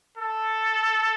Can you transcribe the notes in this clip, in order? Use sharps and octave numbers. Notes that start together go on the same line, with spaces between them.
A4